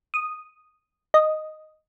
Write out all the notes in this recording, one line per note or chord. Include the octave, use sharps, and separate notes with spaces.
D#6
D#5